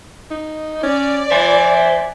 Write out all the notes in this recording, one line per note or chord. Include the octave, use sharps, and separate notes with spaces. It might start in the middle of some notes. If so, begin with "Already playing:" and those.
D#4
C#4 D5
C5 E5 G#5